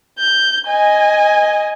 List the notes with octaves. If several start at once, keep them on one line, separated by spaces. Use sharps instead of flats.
G6
D#5 G#5